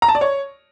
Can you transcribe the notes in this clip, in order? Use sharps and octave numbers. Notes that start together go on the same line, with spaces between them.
A#5
A5
D5
C#5